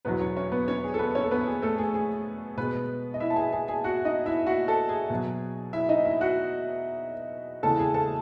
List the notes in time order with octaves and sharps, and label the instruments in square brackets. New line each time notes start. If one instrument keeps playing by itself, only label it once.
[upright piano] E2 B2 F#3 B3 B4
C#4 C#5
C#4 C#5
B3 B4
C#4 C#5
G#4
A4
B3 B4
C#4 C#5
A4
B3 B4
G#4
A3 A4
G#4
G#4
B2 G#3 B3 B4
D#5
E4 E5
A5
G#4 G#5
G#4 G#5
G#4 G#5
F#4 F#5
D#4 D#5
E4 E5
F#4 F#5
A4 A5
G#4 G#5
B2 F#3
E4 E5
D#4 D#5
E4 E5
F#4 F#5
E2 C#3 E3 G#3 A4 A5
G#4 G#5
A4 A5